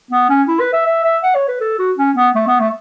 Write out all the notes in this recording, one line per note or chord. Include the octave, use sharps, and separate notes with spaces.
B3
C#4
E4
B4
E5
E5
E5
F#5
C#5
B4
A4
F#4
C#4
B3
A3
B3
A3